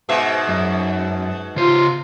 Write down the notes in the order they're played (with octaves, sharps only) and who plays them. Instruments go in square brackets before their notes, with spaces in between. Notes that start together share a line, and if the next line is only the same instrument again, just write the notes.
[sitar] G#2 B2 E5
[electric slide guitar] F#2
[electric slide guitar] C#3 C5 [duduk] F4